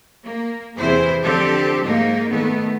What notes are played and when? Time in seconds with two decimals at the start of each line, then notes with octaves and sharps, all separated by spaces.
0.25 A#3
0.77 E2 C3 E3 E4 G#4 C5
1.22 D3 F3 C4 G4 A4
1.83 G#2 A#3 D#4
2.31 D#3 A3 B3